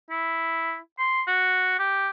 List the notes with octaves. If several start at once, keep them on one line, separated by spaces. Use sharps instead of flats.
E4
C6
F#4
G4